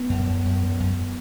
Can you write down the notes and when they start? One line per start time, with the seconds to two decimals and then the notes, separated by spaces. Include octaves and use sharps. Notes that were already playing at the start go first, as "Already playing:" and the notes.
Already playing: B3
0.10 F#2
0.27 F#2
0.45 F#2
0.63 F#2
0.80 F#2